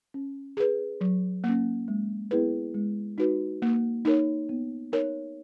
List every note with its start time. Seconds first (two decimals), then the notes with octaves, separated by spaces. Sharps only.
0.14 C#4
0.57 G#4 B4
1.01 F#3
1.44 A#3
1.49 C#4
1.88 G#3
2.31 B3 E4 G#4 B4
2.74 G#3
3.18 D#4 F#4 B4
3.62 A#3
4.05 D#4 A#4 C#5
4.49 B3
4.92 D#4 A#4 C#5